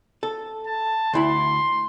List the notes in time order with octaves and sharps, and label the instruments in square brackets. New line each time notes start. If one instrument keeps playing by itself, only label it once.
[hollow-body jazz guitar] A4
[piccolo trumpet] A5
[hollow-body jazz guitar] D2 E4 B5 [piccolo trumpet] C6